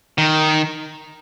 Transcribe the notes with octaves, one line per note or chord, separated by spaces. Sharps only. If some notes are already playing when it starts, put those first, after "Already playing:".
D#3